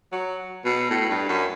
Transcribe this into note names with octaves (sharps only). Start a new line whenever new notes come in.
F#3
B2
A2
G2
F#2